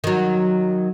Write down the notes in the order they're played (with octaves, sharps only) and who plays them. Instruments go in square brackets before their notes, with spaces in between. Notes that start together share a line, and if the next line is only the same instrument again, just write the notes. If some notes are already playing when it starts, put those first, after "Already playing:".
[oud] D#3 F#3